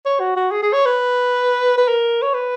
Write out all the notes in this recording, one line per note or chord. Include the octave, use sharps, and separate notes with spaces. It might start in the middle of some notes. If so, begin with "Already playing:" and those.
C#5
F#4
F#4
G#4
G#4
C#5
B4
B4
A#4
C#5
B4